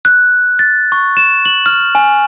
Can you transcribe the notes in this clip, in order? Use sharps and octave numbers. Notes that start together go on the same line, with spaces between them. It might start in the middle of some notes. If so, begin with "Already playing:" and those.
F#6
A6
C#6
E7
F#7
F6
G#5